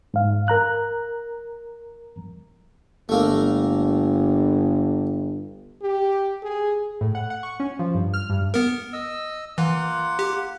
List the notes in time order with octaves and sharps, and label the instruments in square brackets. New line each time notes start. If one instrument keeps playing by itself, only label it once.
[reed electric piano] G#2 F5
A#4 A#5 F#6
[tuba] G1 [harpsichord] A3 A#3
[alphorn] G4
G#4
[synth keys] A2
F#5
F#5
C#6
C#4
F3
G2
F6
G2
[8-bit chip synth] B3 A#4
[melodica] D#5 E6
[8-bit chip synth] E3 [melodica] A#3 F4 F#5
[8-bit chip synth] G4